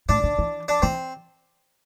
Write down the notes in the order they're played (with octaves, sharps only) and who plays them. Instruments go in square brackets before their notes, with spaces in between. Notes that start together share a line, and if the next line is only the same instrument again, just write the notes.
[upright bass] A2 [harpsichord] D4
[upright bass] D3
E3
[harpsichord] D4
[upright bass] E3 [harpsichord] C4